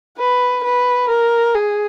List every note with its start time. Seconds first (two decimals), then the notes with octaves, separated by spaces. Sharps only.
0.18 B4
0.64 B4
1.09 A#4
1.55 G#4